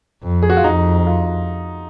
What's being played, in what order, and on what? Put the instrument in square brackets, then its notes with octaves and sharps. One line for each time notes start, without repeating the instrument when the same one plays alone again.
[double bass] F2
[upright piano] G#4
F#4
F4
[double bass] F2 [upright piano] D#4
[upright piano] F4